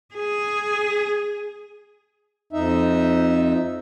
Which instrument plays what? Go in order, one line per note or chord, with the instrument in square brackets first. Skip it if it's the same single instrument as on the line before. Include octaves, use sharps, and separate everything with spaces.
[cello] G#4
[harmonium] F2 D#4 E5